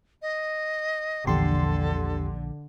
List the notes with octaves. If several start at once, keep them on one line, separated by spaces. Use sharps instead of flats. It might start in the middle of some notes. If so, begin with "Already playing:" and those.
D#5
A#1 E2 D3 G4 A4 C6